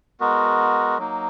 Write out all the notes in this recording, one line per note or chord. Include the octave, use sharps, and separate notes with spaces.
G#3 B3 F#4 A#4
F#3 A#3 D#4